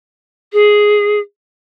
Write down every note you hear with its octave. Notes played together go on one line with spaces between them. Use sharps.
G#4